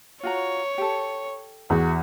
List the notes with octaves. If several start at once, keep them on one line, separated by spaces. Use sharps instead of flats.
F4 F#4 C#5 A#5
G4 A4
E2 F#4